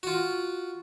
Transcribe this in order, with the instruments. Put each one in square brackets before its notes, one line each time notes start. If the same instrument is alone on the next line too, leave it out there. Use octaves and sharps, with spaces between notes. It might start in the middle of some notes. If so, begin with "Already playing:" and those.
[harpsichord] F4 F#4